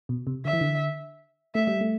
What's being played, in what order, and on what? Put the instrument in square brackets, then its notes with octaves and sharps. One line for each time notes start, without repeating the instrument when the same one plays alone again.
[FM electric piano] B2
C3
[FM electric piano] D3 [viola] E5
[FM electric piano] E3
D3
[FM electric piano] A3 [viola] E5
[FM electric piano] G3
A3